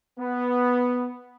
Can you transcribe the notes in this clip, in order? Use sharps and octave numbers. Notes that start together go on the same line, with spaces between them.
B3